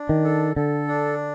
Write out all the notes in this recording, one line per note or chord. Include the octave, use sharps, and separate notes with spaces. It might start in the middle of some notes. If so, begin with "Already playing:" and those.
Already playing: D4
D#3
A4
D3 A4
D4